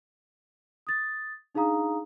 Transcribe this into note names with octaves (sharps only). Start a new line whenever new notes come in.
D#6 A6
D4 D#4 G#4 F5 A#5 D#6